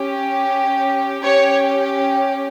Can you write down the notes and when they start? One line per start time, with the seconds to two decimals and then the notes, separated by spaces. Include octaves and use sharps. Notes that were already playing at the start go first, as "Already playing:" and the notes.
Already playing: C#4 G4
1.22 C#4 G4 C#5